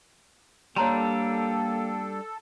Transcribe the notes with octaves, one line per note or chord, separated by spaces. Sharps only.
G3 A#3 D4 A4 C#5 A#5 C6